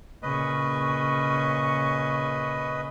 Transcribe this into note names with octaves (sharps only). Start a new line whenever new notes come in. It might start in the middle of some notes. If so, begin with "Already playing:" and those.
A#2 C#3 B4 D#5 C#6